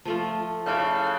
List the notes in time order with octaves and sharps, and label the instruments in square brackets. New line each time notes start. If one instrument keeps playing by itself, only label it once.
[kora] F3 A3 F4 [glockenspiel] A5
[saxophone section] C#3 [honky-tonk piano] E4 A4 F5 [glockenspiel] A5 D6 G6
[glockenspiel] F#6